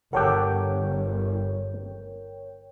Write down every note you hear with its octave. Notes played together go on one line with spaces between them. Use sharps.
G1 G4 A4 A#4 C#5 F#5 G5